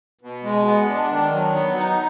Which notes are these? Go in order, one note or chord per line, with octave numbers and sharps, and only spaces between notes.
B2
G#3
B3
D4
D#3
F#3
B3
D#4